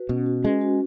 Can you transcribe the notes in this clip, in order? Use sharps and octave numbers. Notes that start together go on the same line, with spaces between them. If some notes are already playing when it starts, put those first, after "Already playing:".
Already playing: F#4 B4
B2 C#4
F#4
G#3 C#4
F#4